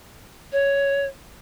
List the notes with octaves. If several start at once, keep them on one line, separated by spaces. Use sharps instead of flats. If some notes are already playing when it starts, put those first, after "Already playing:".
C#5